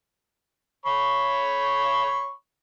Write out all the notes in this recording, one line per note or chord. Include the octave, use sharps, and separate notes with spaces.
C#5 B5 C#6